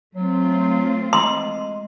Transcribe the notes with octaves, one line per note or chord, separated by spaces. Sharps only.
F#3 A3 C4 F4
G#3 C6